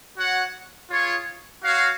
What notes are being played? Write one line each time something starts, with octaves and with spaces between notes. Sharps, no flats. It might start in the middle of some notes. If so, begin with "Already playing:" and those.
F#4 C#5 F#5
F4 G#4 C#5
F#4 C#5 F5